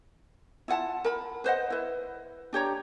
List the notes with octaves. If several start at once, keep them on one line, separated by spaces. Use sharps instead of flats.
E4 F4 F#5 A5
A#4 B5
B4 C5 D#5 F#5
E4 B4
D4 G4 C#5 A#5